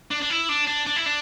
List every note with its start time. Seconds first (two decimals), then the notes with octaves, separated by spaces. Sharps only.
0.11 D4
0.22 D4
0.30 E4
0.49 D4
0.67 D4
0.87 D4
0.96 E4
1.06 D4